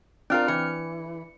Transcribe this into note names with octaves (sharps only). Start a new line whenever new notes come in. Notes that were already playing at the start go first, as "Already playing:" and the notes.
C4 D4 F4 A#4 F6
E3 C#7